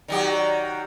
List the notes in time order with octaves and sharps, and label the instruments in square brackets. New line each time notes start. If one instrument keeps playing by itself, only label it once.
[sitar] D#3 F#3 G4 [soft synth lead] D5